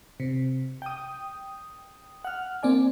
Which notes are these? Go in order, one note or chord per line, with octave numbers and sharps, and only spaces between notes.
C3
G5 D#6
F#5 F6
A#3 C4 D5 G#5